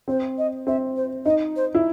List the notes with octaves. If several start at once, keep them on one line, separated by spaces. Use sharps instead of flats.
C4 C5
D#5
C4 E5
C5
D#4 D#5
C5
E4